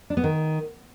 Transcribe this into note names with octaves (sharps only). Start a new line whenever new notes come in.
D4
B3
D#3